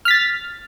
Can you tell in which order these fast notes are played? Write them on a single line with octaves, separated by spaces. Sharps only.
F6 B6 A6